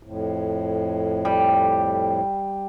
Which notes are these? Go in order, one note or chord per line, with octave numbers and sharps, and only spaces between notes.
F2 A2
G3